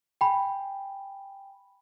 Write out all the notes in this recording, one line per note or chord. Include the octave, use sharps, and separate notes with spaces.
G5 G#5 B5